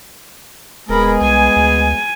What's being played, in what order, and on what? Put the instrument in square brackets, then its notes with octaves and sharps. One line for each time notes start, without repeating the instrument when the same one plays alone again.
[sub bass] D#1 [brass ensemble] G#3 B3 G#4 [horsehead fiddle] A#4 B5
[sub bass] C2 [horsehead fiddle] G#5
[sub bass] D2